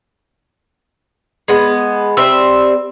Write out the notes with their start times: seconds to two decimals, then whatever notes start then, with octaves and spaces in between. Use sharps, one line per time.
1.48 G#3 B3
2.17 G3 C4 E5